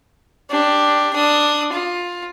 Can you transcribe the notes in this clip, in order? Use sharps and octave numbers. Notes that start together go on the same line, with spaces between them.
D4 G4
D4 D#6
F4